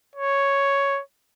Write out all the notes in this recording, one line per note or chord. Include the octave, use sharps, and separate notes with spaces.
C#5